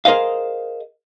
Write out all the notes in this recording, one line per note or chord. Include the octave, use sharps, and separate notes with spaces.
G#4 A#4 C5 D#5 F5